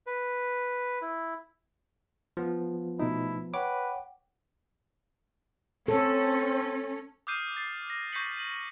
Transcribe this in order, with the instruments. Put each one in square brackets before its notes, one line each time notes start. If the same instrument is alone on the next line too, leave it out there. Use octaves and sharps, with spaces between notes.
[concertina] B4
E4
[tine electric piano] F3 B3 [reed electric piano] F4
[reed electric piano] B2 D#4 [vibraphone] A3 [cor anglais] E4
[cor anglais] B4 [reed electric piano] C#5 [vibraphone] F#5 G5 [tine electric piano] D6
[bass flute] C4 [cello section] C#4 [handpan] A4
[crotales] D6 D#6 F6 G6 C7 D#7
A6 C7
A#6
C#6 G6 A#6 B6 C#7 F#7
D#7 F#7